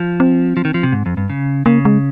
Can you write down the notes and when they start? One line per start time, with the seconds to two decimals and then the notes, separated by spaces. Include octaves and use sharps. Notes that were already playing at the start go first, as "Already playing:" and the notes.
Already playing: F3
0.20 C4
0.57 F3
0.65 D#3
0.74 F3
0.83 C3
0.92 G#2
1.06 F2
1.17 G2
1.30 C#3
1.66 C#3 A#3
1.85 G#3